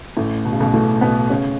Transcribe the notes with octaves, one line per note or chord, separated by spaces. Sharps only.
A1 A2
B2
C#3
B1 B2
A2 A3
B2 B3
C#3 C#4